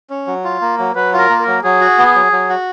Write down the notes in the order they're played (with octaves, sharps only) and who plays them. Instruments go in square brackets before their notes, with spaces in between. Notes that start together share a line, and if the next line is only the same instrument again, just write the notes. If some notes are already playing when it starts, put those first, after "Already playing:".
[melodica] C#4
F#3
F4
A#3
F#3
[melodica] F#3 [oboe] B4
[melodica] F4
[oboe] A#4
[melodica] A#3
[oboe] A#4
[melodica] F#3
[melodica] F#3 [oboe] G#4
[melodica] F#4
B3
F#3
F#3
F#4